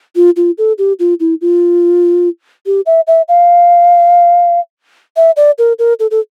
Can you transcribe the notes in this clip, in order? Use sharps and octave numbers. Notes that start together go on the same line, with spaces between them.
F4
F4
A4
G4
F4
E4
F4
G4
E5
E5
F5
E5
D5
A#4
A#4
A4
A4